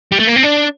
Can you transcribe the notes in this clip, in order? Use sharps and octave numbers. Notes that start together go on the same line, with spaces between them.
G3
A3
A#3
C4
D4